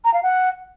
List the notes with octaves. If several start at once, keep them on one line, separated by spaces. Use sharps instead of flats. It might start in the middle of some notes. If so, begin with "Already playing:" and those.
A#5
F5
F#5